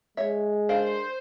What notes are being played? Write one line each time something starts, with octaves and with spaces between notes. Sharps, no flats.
G#3 C#5 E5
D4 A#4 C5 F5